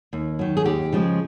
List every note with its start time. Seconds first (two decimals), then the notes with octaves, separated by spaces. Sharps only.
0.13 D#2
0.39 D#3 F#3
0.57 G#4
0.65 D#2 G4
0.93 C#3 F3 G#3